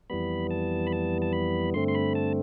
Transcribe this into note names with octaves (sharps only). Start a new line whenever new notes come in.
F2 E3 G3 B3 B5
A5
B5
A5
A5
B5
G2 D3 A3 C4 C6
C6
B5
A5